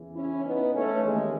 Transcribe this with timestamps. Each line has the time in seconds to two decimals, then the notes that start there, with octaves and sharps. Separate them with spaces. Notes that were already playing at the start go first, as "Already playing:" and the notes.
Already playing: E2 C#3 E3
0.16 C#4 E4
0.45 B3 D#4
0.74 A3 C#4
1.03 D#2 C#3 E3 G#3